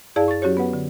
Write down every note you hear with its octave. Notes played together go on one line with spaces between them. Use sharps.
F#2 E4 G#4 D5 F5 A5
C#6 A6
F#3 C#4 F#4 G4 C#5
B3 B4 F#5
D3